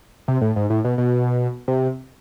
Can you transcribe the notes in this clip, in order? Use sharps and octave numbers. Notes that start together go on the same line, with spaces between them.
C3
A2
G#2
A2
B2
B2
C3